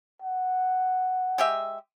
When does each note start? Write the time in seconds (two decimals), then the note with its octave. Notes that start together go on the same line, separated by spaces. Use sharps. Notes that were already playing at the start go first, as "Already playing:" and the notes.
0.22 F#5
1.38 G#3 G4 E5